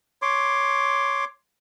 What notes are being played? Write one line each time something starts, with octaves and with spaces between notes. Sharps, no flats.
C#5 C6 D6